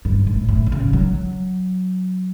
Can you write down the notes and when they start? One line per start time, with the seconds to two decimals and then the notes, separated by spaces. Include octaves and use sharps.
0.05 G2
0.27 A2
0.49 A2
0.67 D3
0.72 C#3
0.93 F#3